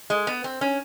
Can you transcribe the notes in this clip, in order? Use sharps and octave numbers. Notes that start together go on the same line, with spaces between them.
G#3
B3
C4
C#4